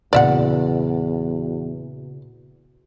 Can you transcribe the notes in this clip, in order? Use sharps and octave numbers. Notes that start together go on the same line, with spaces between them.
E2 A#2 C#3 F#4 D5 E5 F#5